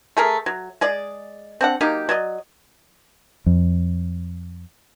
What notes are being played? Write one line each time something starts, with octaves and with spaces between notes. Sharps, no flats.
A3 G#4 A#4
F#3
G#3 G#4 D5
C4 D4 F#5
F#3 A#3 D#4 G4
F#3 D5 D#5
F2